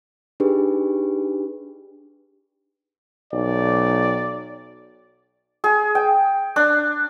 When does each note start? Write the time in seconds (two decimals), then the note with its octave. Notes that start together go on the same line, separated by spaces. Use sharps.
0.40 D4 D#4 G4 G#4 B4
3.33 B1 D5
5.64 G#4
5.95 G5
6.56 D4